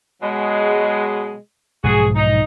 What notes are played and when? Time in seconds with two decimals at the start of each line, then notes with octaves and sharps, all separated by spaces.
0.22 B2 F#3 G#3
1.84 B1 G#2 F3 F#4 G#4
2.15 D#4